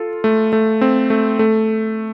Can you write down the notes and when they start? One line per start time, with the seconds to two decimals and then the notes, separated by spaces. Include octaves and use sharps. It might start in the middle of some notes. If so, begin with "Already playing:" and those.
Already playing: F4 A4
0.24 A3
0.53 A3
0.81 C4
1.10 A3
1.39 A3